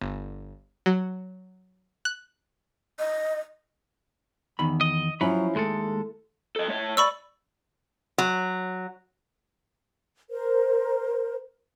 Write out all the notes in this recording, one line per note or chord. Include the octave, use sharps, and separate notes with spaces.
G1
F#3
F#6
D#5
E2 D#3 B5
D#5
F3 F#3 C#4 E4 B5
D#2 G#3 A3 A4
A4 D#5
A3 C#5
C2 D5 B5 C#6 E6
F#3
A#4 C5